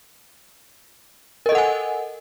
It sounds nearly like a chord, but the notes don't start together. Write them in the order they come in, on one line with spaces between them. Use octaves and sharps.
A#4 D#5 A4 F#5 G#5